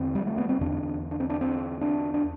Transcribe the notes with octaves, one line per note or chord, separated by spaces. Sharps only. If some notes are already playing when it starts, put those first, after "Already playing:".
Already playing: E2 D3 C4
G3
A3
B3
C4
E2 D3 D4
D4
C4
D4
C4
D4
D4